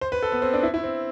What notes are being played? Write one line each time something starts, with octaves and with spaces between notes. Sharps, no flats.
C5
B4
A4
B3
C4
D4
E4
E4
C4